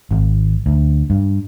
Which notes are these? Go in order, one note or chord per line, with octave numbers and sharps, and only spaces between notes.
G#1
D2
G2